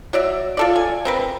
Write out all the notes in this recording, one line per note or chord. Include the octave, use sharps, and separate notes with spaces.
F#3 D5 E5
F4 A4 D5
G#5
C4 A#4 B4